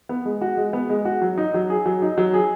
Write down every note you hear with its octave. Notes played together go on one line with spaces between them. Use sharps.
B3
G#3
F#4
G#3
B3
G#3
F#4
F#3
D#4
F#3
G#4
F#3
D#4
F#3
G#4